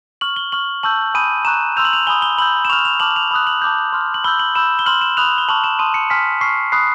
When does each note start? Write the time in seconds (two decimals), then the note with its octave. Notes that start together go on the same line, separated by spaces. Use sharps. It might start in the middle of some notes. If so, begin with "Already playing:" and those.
0.21 C#6 F6 F#7
0.36 G7
0.52 C#6 F6 F#7
0.83 A5 C#6 E6 G6 F#7
1.14 G#5 B5 D#6 G6 D#7
1.45 A#5 C#6 F#6 E7
1.76 C6 E6 G6 F7
1.85 F#7
1.93 F7
2.07 G#5 B5 D#6 G7
2.22 G7
2.38 B5 E6 G6 F#7
2.65 E7
2.69 C#6 F6 F7
2.85 F7
3.00 A5 D6 F6 F#7
3.16 F7
3.31 B5 D#6 F#6
3.47 F#7
3.62 A5 D6 G6
3.93 C6 F6
4.14 F#7
4.24 B5 E6 G6 G7
4.39 F#7
4.55 B5 E6 G6 E7
4.79 G7
4.86 C6 F6 F#7
5.01 E7
5.17 B5 D#6 F#6 F7
5.38 G7
5.48 A5 C#6 F6 F#7
5.64 E7
5.79 A5 C6 D#6 D#7
5.94 C#7
6.10 G#5 C6 F6 B6
6.41 C#6 F6 C7
6.72 B5 D#6 F#6 C7